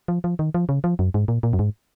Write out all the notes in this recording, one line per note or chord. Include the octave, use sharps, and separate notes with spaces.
F3
F3
D#3
F3
C#3
F3
F#2
G#2
A#2
A#2
F#2
G#2